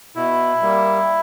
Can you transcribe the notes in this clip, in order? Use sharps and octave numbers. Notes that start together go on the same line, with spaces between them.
B2 E4
G3 A#3